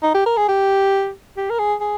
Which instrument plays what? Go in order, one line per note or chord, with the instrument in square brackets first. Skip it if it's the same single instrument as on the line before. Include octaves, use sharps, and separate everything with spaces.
[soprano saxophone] D#4
G4
A#4
G#4
G4
G4
A#4
G#4
G#4